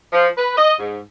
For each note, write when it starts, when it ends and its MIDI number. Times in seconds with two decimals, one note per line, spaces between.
0.13 0.28 53
0.37 0.55 71
0.57 0.73 75
0.79 0.99 44